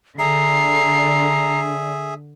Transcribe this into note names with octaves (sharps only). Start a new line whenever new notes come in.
D3 G#4 E5 A#5 C7